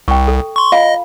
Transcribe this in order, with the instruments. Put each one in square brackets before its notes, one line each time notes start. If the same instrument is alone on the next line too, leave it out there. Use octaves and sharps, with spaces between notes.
[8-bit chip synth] C2 [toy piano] G5 C#6
[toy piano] A4
[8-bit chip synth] C6 C#6
[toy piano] F4 F5 B5 [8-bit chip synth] D#5